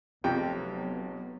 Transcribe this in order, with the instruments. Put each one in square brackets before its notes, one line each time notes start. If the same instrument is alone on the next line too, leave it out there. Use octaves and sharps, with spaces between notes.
[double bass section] F1 F#3 B3 [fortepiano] F2 C3 G5